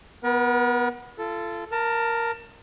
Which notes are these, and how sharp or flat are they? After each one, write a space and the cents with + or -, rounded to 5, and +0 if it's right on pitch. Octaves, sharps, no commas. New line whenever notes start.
B3 +0 A#4 +45
F4 -35 A4 +0
A#4 +0 A5 +25